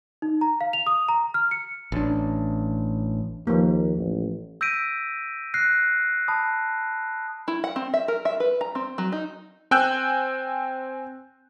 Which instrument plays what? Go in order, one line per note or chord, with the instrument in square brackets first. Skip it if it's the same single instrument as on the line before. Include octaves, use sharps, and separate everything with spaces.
[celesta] D#4
A#5
F5
F7
D#6
A#5
F6
C#7
[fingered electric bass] A1 D4
[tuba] D#2 [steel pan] F3 A#3
[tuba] A1
[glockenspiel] E6 G6 A#6 B6 D7 D#7
F6 F#6 A#6 C7
A5 B5 D#6
[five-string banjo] E4
F#5
C4
E5
A#4
E5
B4
A#5
C4
F#3
D#4
[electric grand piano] C4 G5 G#5 E6 F#6 G6